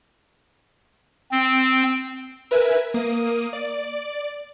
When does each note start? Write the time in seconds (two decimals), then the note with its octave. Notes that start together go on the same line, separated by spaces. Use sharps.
1.32 C4
2.51 A#4 B4 E5 G#5
2.94 A#3 D#6
3.53 D5